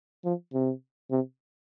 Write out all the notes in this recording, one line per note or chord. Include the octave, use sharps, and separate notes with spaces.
F3
C3
C3